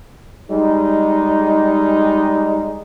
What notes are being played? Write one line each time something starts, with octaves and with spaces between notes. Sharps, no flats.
G3 G#3 D#4